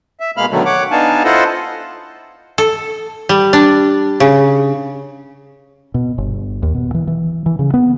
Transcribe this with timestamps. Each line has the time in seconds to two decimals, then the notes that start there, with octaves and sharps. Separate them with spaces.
0.20 E5
0.37 B2 G#3 A#3 F5 B5 F6
0.51 B2 D3 D#3 F#3 A3
0.65 C#5 F#5 D6
0.91 B3 D4 D#4 F5 G#5 A5
1.24 E4 F4 A4 C5 D#5 F#5
2.58 A4
3.29 G3
3.53 D4
4.20 C#3
5.94 B2
6.18 G1
6.63 D#2
6.75 B2
6.94 E3
7.08 E3
7.46 E3
7.59 C#3
7.74 B3